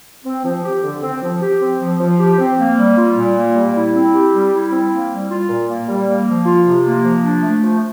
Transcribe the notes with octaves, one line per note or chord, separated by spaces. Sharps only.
C4
F3
G4
D3
C4
F3
G4
C4
F3
F3
G4
C4
A#3
G3
F4
A#2
A#3
G3
E4
C4
G4
G3
E4
C4
A#3
G3
F4
A#2
A#3
G3
A#3
F3
F4
C3
A#3
F3
D4
A3
F3